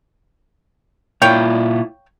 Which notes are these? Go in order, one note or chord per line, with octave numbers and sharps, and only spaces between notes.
A#2 E4 F4 C#5 F5 G5